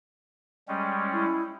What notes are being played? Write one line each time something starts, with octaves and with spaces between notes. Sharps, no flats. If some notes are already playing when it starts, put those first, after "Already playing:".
G3 G#3 C#4 G5
E4